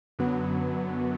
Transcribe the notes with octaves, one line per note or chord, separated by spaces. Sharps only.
F#2 D3 F#3 B3